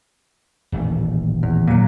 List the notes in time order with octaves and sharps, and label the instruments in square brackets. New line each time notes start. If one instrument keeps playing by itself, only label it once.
[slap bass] D#1 A1 A3
[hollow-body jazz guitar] E2
A#2 F#3